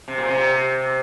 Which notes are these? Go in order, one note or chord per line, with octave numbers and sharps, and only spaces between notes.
C3
A#2
C3